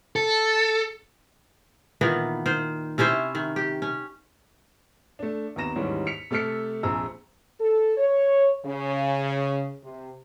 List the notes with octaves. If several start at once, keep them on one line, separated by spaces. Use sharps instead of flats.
A4
A#2 D#3 E3 B3
D#3 C5
C3 C#4 E4 C5
D#3
G4
C#4
A3 D4
D#2 B3 C4 A#5 A#6 E7
D#2 G#2 D#3 E3 G3 C#4
B6 C#7 F7
C3 A3 A4 F6 B6 C#7
A#1 F2 G#4 A#5 E6
A4
C#5
C#3
C3